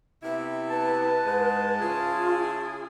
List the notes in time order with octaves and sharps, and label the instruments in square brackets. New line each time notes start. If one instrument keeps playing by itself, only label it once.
[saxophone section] C3 B3 E4 [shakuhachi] E5
[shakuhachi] B4 [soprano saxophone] A5
[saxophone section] G#2 G#3
[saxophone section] C#3 E4 G#4 [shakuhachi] F4